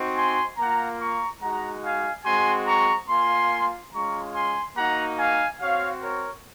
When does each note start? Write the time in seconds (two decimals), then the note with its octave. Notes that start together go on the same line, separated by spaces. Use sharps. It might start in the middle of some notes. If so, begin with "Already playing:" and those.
Already playing: C4 D#4 F#4
0.17 G#5 C6
0.58 A#3 F4 F#5 A#5
1.01 A#5 C#6
1.42 G#3 D#4 F#4 F#5 A#5
1.84 F5 G#5
2.25 G#3 C4 F#4 G#5 C6
2.68 A#5 C#6
3.09 A#3 F4 G#5 C6
3.93 G#3 C#4 F4 A#5 C#6
4.35 G#5 C6
4.77 A#3 D#4 F#4 F#5 A#5
5.19 F5 G#5
5.61 C4 F#4 C#5 F5
6.02 A#4 C#5